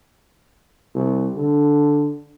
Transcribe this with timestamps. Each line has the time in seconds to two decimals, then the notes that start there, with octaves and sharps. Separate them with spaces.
0.95 C2
1.36 D3